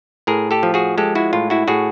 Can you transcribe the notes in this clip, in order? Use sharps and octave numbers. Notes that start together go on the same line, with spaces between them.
A2 G#4 A#4
G4 A4
F3
F#4 G#4
G#3 G4 A4
E4 F#4
A2 F4
E4 F#4
A2 F#4 G#4